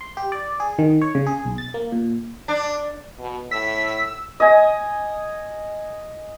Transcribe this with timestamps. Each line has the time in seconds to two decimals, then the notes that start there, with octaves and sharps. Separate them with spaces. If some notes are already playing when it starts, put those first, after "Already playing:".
0.01 C6
0.17 G4
0.32 D5
0.60 G#4
0.79 D#3
1.02 C#5
1.15 C#3
1.27 G#4
1.45 B1
1.58 A6
1.74 A#3
1.92 A#2
2.48 D4
3.19 B2
3.51 A2 E6 B6
4.40 D#5 G#5